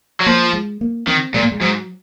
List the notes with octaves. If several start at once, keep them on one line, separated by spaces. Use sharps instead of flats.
F#3
F3 A#3
G#3
A#3
D#3 C4
A#2 G#3
A#3
G#3
G#2 F#3